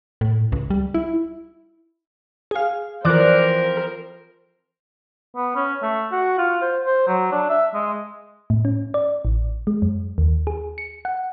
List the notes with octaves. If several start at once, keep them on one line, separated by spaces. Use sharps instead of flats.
A2
C#2
G3
E4
G#4 F5
E3 F3 C4 A#4 C5 D5 D6 F#6
B3
C#4
A3
F#4
F4
C5
C5
F#3
D4
E5
G#3
A2
C#4
D5
A1
G#3
F#2
D#2
G#4
C#7
F#5